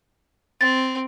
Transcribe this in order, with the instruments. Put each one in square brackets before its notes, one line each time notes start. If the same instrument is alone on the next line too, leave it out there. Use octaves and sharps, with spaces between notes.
[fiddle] C4 [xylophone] A6